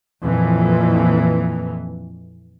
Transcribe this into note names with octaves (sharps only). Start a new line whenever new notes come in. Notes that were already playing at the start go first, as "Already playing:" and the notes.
F2 A#2 E3